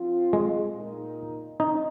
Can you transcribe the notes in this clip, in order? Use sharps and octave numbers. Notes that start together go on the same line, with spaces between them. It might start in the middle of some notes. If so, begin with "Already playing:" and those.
Already playing: F3 C4 F4
G#3
A#2 A#3 D#4
C4 D#4